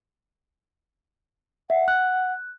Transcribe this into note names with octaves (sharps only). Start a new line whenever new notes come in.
E5 F#5
F#6